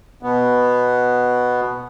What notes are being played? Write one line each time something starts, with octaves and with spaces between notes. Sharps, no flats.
B2 B3